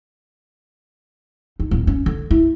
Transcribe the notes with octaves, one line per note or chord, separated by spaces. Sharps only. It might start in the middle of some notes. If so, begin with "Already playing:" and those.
D#4
D1
C#4
D3
E4